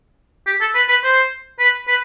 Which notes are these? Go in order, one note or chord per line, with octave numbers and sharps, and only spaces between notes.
G4
A4
B4
B4
C5
B4
B4